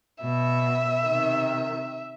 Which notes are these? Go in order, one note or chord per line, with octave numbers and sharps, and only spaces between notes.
B2 E5
C3 D#3